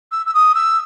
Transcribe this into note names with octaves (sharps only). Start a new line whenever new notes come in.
E6
E6
D#6
E6